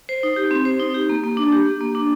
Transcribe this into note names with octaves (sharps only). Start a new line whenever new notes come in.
C5
D#4
G4
C4
C5
D#4
G4
A#3
A#3
D4
G4
A#3
A#3
D4